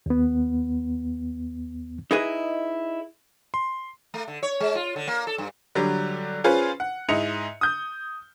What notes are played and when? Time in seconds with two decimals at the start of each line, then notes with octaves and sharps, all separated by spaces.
0.06 D#2 B3
2.11 D#4 E4 G#4 B4 D#5
3.54 C6
4.14 A3
4.28 D3
4.43 C#5
4.60 G#3
4.75 F4
4.96 D3
5.08 A#3
5.27 A4
5.38 G2
5.75 D3 F#3 G3
6.44 C#4 F4 G#4 B4 C5
6.80 F#5
7.09 G#2 E4 D#5 C#7 F7
7.61 D#6 G6